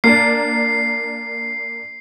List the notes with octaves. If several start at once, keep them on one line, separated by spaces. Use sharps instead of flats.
A#3 D4 C7